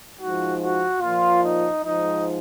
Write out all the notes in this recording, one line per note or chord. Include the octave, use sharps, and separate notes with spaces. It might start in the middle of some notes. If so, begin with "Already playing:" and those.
G#2 F3 F#4
F#4
A#2 F3 F4
D#4
G#2 F3 D#4